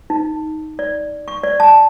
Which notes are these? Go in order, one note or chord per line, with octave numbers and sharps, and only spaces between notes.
D#4
D5
C#6
D5
A5